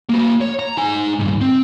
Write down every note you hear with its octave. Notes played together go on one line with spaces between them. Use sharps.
A#3 F#4
C#5
A#5
D#4 G#5
C#2 G2
C4